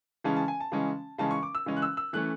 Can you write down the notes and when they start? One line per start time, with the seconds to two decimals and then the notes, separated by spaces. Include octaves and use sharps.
0.24 C#3 E3 G#3 C#4 A5
0.36 A5
0.48 G#5
0.60 A5
0.72 C#3 E3 G#3 C#4
1.18 C#3 E3 G#3 C#4 A5
1.31 C#6
1.43 D6
1.55 E6
1.66 C#3 E3 G#3 C#4
1.77 F#6
1.82 E6
1.97 E6
2.13 E3 A3 C#4 F#6